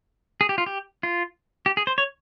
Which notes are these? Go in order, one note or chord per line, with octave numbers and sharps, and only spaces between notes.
G#4
G4
F4
G4
F4
G4
G#4
C5
C#5